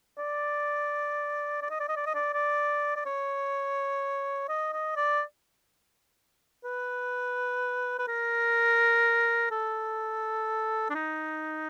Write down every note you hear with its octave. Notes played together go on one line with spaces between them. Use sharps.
D5
D5
D#5
D5
D#5
D5
D#5
D5
D5
D5
C#5
D#5
D#5
D5
B4
B4
A#4
A4
D4
D#4